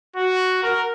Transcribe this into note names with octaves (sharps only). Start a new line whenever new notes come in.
F#4
A#4